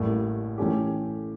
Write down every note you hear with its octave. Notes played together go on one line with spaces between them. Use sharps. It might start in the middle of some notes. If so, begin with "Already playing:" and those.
Already playing: A1 A2 G3 A#3
A2 E3 A3 C#4 G4